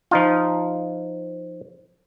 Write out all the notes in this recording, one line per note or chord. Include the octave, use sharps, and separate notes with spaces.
F3 D#4 F4